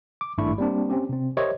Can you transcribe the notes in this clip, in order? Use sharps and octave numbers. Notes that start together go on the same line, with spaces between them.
D6
G#1 G2 A3 D4 E4 C#6
G3 A#3 C4 D4
C4 C#4 G4
C3 C4
G4 A#4 C5 C#5 D#5 E5